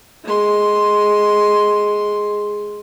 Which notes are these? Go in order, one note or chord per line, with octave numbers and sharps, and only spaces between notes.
G#3 C6